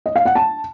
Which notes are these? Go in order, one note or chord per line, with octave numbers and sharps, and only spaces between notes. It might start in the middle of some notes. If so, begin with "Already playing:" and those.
D#5
F5
F#5
A5